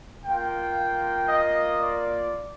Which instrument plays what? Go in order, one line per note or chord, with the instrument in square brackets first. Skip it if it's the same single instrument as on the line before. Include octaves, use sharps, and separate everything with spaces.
[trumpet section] A#3 F4 G5
D#5
D5